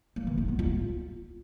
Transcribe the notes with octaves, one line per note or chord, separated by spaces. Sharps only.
A#3
E3
D#4
B3
F4